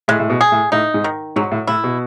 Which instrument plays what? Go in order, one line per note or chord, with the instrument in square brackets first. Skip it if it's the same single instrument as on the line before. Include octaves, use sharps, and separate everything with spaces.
[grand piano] A2 [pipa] G#3
[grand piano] A2
B2
[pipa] G#4
[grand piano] A2
[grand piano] A2 [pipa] D#4
[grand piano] G#2
[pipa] D#3
[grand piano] G#2 [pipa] F#3
[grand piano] A2
[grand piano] A2 [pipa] E4
[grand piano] B2